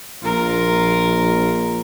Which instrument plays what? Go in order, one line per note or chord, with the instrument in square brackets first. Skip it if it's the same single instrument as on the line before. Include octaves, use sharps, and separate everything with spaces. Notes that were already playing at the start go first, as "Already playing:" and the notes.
[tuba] A#1 [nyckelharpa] F4 A#4